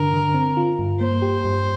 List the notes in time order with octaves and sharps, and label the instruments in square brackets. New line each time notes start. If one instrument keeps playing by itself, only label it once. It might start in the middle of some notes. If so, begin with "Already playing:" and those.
Already playing: [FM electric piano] G2 D3 D4 [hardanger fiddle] A#4
[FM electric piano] D3
C4
F4
G2
[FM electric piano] A#3 [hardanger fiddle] C5
[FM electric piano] G4
G2